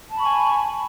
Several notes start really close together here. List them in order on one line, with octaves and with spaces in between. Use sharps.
A5 B5 C#6 G#5